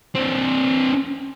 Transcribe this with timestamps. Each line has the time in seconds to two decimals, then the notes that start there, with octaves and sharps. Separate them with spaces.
0.15 C4 D4